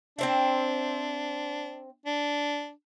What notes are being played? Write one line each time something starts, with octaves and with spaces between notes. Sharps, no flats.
C4 D4 C5 E5
D4